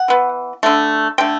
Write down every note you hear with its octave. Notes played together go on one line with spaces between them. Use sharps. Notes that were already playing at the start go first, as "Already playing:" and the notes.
Already playing: F#5
E3 B3
D3 A3
D3 A3 G5